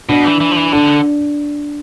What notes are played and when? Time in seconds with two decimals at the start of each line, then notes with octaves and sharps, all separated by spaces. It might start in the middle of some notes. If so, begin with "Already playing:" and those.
0.09 B2 D4
0.25 E3
0.40 E3
0.52 F3
0.56 E3
0.72 D3 D4